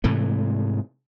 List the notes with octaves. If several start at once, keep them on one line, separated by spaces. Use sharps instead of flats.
G#2 C3 E3 A3